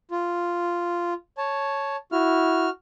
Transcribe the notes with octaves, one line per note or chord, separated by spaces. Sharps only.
F4
C#5 A5
E4 F#4 F6